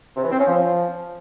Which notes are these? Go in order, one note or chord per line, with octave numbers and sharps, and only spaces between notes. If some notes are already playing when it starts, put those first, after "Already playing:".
C3
E3
C4
C#4
F3